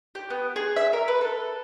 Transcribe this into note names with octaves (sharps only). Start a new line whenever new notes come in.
G4
B3
G#4
E5
A#4
B4
A4